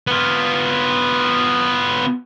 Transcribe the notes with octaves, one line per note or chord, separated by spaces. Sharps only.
B3 F4